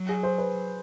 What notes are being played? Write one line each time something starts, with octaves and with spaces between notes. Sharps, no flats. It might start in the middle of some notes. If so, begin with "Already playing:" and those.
Already playing: F#3
G#4
C5
B4